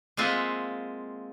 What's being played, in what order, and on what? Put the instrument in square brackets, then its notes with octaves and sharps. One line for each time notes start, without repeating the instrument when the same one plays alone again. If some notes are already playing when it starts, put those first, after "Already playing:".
[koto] G#3 A#3 C4 F4 E5 F#5